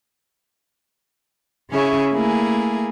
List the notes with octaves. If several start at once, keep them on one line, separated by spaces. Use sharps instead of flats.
C#3 C#4 E4 G#4 E5 C#6
A3 A#3 E4 G#4 G#5